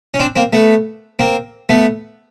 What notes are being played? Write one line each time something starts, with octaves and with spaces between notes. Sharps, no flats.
C#4
C4 D4
A#3 C4
A3 B3
A#3 C4
A3 B3